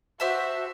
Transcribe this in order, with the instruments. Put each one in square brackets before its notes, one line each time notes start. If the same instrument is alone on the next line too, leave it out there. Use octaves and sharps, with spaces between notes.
[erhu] F#4 [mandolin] G4 C5 E5 A5